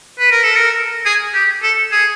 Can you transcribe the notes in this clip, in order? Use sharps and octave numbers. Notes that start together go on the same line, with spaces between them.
B4
A#4
A4
A#4
G#4
G4
A4
G#4